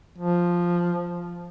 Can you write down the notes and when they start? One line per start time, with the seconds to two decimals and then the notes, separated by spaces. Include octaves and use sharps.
0.18 F3